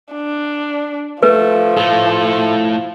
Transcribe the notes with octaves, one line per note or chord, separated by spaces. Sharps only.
D4
F3 A3 B4
A2 A3 A4